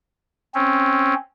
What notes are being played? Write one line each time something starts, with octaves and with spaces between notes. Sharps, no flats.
C4 C#4